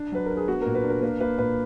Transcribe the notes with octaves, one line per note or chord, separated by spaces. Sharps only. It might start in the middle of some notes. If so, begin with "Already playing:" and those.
Already playing: D4
F#3 B4
D4 A#4
G#4
B3 F#4
A#2 A#4
B4
D4
A#4
A#3 B4
A#3 B4
A#2 B4